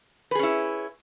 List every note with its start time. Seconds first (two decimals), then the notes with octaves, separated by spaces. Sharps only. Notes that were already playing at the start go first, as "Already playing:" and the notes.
0.31 B4
0.35 G#4
0.39 C#4
0.43 E4